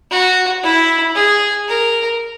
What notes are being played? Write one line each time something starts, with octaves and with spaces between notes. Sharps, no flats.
F#4
E4
G#4
A#4